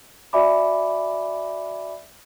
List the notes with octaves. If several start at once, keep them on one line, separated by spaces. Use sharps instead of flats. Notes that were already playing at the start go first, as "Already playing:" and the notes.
F#4 D5 E5 G#5 B5 D6